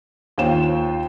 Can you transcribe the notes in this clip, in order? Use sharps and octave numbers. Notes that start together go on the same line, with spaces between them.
D#2 F4 C5 C#5 G5 E7